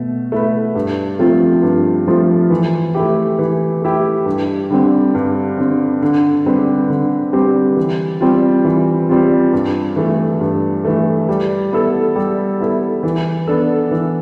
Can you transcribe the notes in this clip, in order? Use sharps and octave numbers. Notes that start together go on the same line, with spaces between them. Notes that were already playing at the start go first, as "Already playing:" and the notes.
Already playing: B2 A3
A3 E4 B4
G2
F3 A3 C4 F4
G2
F3 A3 C4 F4
E3
A3 E4 G4
E3
A3 E4 G4
G2
D3 G3 C4
G2
D3 G3 C4
D3
G3 C4 G4 B4
D3
G3 C4 G4 B4
E3
G3 C4 F4
E3
G3 C4 F4
G2
E3 A3
G2
E3 A3
G3
B3 E4 A4
G3
B3 E4 A4
E3
B3 D4 A4
E3